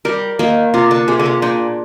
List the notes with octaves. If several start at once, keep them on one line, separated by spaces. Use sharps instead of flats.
G3 A#4
D#3 A#3
C3 F4
D3
C3 G#4
D3
C3
A#2 D4